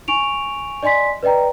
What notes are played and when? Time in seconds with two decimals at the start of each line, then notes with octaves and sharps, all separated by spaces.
0.08 G#5 C#6 D7 F7
0.83 D5 D#5 G#5 C6 B6
1.23 B4 D5 D#5 G5 A#5